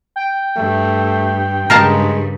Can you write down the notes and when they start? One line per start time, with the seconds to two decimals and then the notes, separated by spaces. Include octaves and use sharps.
0.16 G5
0.57 G2 A3
1.70 G2 C#3 G#3 A#4 F5 A5